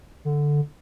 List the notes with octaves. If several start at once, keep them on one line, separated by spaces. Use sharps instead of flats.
D3